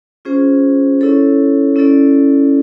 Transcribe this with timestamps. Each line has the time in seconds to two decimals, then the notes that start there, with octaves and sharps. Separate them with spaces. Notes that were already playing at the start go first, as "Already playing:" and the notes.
0.25 C#4 F4 G#4 C5
1.01 C#4 E4 A4 C#5
1.76 C#4 E4 A4 D5